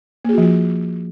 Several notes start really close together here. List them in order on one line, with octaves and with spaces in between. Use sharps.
A#3 G#4 F#4 F3 F4